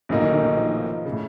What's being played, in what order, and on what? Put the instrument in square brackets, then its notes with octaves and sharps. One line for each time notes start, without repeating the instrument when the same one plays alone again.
[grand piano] A#1 A2 F#3 A#3 D#4 [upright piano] C#3
[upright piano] D#3
D#3
D#3
F3
[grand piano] C#3
[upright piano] A2